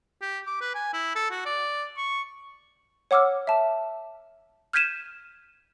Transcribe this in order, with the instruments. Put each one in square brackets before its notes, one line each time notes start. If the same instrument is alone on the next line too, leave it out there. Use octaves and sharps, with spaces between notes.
[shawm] G4
D6
B4
G#5
E4
A4
F#4
D5
C#6
[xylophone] C#5 F#5 D6 E6 F6
E5 A5
F6 G6 G#6 B6 D#7 E7